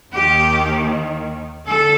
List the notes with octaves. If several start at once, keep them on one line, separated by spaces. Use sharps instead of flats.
D#2 D#3 G4
D3 A4